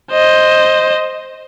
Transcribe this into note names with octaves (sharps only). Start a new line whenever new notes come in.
C5 D#5